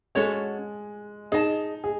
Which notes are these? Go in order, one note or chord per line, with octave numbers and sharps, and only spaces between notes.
G#3 C#4 F#4 A4 C#5
D#4 G#4 D#5 A5
G#4